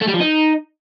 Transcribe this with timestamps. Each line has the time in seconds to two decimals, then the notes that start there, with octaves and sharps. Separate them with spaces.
0.02 A3
0.08 G3
0.14 F3
0.21 D#4